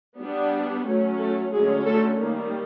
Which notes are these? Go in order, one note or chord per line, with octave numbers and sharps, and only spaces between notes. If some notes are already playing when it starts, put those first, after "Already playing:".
G3 B3 D4
F#3 A3 C#4
A3 A4
D3 F#3 G#3 A3 C#4 G#4
A3 A4
D#3 G3 A#3